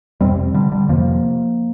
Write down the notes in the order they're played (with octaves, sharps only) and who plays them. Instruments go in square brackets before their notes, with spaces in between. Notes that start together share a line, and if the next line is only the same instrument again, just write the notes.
[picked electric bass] F2 C3 G3 C4
D3 G3
D3 G3
F2 C3 F3 A#3